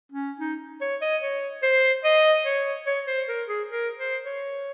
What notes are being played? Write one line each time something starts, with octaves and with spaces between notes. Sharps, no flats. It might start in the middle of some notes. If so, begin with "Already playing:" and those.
C#4
D#4
C#5
D#5
C#5
C5
D#5
C#5
C#5
C5
A#4
G#4
A#4
C5
C#5